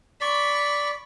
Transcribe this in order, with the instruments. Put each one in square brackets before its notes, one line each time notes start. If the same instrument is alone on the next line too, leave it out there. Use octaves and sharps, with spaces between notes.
[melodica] D5 [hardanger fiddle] B5 C#6